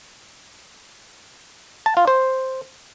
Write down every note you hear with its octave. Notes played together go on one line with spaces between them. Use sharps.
A5
F4
C5